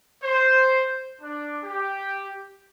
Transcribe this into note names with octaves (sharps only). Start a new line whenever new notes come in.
C5
D4
G4